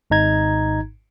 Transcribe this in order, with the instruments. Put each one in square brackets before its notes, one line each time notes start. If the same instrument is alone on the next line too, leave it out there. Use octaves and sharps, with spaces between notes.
[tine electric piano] G#1 G#2 D#4 A#5 G#6